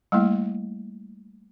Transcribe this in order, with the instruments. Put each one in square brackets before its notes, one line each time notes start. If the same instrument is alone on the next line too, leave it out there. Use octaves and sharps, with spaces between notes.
[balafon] G3 A3 A#3 E4